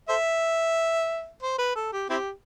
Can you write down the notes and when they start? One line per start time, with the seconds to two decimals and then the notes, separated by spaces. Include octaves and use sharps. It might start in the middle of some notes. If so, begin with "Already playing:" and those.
0.09 A4 C5 E5
1.43 C5
1.59 B4
1.76 A4
1.93 G4
2.10 C4 E4 G4